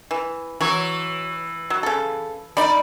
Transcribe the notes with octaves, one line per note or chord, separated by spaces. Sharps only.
E3
E3 F#3 C#5
F#3
C#3 A4
D#4 D5 B5